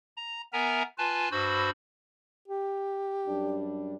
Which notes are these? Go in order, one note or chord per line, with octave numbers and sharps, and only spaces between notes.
A#5
B3 A#4 E5 G#5 A#5
F4 B4 G#5 A5
G2 F#4 C5 B5 E6
G4
F#2 G3 D4